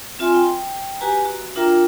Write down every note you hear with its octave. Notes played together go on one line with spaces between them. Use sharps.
C4 F4 E5 G#5 C6
G5
F#4 G4 B4 G#5 A#5
F#4
D4 F4 A#4 E5 G5 A#5